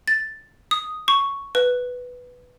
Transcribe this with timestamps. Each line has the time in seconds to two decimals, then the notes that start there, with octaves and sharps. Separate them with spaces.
0.08 A6
0.71 D#6
1.08 C#6
1.55 B4